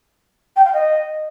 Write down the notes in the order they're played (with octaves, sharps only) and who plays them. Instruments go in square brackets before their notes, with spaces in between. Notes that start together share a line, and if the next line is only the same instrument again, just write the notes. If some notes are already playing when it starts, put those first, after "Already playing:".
[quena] G5
F5
D#5